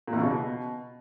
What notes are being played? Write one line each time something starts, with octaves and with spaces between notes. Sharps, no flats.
A#2
E2
C#3
B2